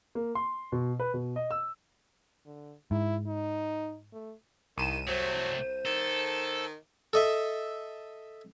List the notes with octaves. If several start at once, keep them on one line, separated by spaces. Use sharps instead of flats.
A#3
C6
B2
B4
B2
D#5
E6
D3
G#2 E4
D#4
A3
C2 D#3 D#7 E7
C3 F#3 A3 C5
D#3 A4
A4 D#5 E5